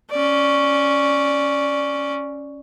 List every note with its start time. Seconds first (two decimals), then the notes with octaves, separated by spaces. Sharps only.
0.11 C#4 D5